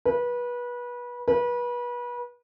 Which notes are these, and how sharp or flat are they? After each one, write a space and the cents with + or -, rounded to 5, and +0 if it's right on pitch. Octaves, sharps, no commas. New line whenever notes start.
B4 -25
B4 -30